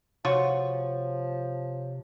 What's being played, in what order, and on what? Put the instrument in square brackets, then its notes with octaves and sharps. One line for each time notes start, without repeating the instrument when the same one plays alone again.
[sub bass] C3 [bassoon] F3 [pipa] F4 F#4 C#6 [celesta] C#5